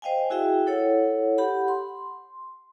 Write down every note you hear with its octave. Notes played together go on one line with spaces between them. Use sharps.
C5 D#5 F5 G5 G#5
E4 F#4 G#4 E5 G5
E4 A4 C#5 F#5
G4 F#5 B5
C6